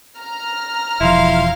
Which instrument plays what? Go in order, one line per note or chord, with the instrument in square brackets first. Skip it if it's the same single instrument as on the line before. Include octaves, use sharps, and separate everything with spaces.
[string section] A#5 F6
[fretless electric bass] E1 F3 [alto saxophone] E4 [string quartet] F5 C6